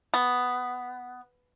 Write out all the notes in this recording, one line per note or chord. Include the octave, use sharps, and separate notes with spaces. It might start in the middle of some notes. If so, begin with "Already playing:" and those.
B3